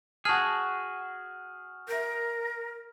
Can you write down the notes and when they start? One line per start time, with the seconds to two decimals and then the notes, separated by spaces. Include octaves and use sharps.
0.25 F#4 G#4 F#5 A5 F6 G#6
1.88 A#4 E5 G6